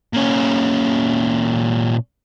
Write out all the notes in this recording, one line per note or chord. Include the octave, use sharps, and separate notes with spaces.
A#2 C#4